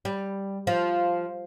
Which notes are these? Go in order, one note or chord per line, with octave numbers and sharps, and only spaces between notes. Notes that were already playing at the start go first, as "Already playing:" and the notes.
G3
F3